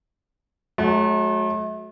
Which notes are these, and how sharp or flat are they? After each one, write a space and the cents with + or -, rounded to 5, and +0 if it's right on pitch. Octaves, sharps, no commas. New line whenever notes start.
F#3 -10 A3 -40